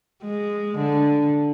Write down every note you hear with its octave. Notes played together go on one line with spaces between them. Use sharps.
G#3
D3